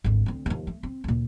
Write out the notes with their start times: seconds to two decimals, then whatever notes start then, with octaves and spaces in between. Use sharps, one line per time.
0.04 G#1 D2
0.26 D2 C4
0.46 D#2 F3
0.67 A3
0.83 C4
1.04 D2 A#2